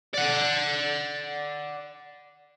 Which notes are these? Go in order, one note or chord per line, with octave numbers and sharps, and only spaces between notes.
D5 F#5